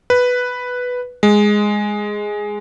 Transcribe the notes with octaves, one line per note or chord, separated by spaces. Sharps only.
B4
G#3